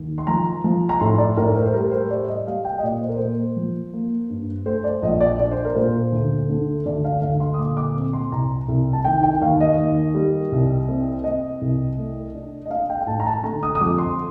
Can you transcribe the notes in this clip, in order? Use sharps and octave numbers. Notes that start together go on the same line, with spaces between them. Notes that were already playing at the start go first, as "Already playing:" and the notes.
Already playing: D#2
C6
F3 A#5
F3
A#5
A2 C6
D5
A2 A#4
C5
C5
G3 A#4
C5
G3 D5
D#5
G3 F5
G5
D#5
A#2 D5
C5
A#4
A#3 C5
F3
A#3
G2
A3 C5
D5
A#1 D#5
D5
D4 D5
C5
A#4
A#2 C5
D2
D3
D2 D5
F5
D2 F5
C6
D#6
A#2 D6
D6
C4
C6
C2 A#5
C2
A5
D#3 G5
G5
D#2 F5
D#5
D#2
G3
C2
C4
C4 D#5
C2
A3
D4
D#5
D4 F5
G5
G5
A2 A5
A#5
A5
D3 A#5
D#6
D#6
F2 D6
C6